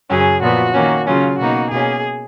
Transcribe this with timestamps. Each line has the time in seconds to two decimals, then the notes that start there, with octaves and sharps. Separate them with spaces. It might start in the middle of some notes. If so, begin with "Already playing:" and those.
0.09 F#2 C#3 F#3 C#4 G#4
0.42 A#2 F3 B3 F#4
0.74 D#3 A#3 C#4
1.07 C#3 F#3 C#4 F4
1.39 B2 A#3 D#4 F#4
1.71 B2 A#3 C#4 G#4